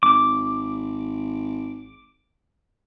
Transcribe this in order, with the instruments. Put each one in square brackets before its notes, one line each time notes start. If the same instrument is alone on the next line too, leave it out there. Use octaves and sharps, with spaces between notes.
[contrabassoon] G#1 [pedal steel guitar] D6